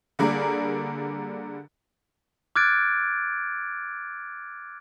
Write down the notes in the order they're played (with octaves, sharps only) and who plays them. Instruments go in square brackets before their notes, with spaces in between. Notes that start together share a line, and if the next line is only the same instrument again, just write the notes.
[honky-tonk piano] D3 G3 A#3 G#4 A#4 D5
[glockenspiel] D6 F6 F#6 G#6 A6 D7